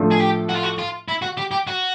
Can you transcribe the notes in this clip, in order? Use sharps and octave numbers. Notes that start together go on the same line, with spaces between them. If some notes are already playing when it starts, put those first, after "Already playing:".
Already playing: A2 F3 A3 D4
G#4
G4
F#4
F4
F#4
F4
E4
F#4
G4
G4
F#4